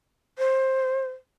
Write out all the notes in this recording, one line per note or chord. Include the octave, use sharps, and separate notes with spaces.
C5